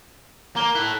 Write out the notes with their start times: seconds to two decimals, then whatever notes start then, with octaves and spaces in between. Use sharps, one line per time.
0.56 A#3 A#5 G7
0.75 E4 A4 F#6